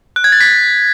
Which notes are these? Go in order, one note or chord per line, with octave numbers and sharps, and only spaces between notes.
F#6
G#6
A6
B6